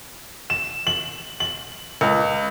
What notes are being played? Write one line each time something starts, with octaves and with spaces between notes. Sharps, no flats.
E7
F#7
F#7
C#2